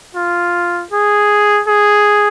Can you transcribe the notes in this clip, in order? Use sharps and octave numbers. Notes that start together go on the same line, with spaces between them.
F4
G#4
G#4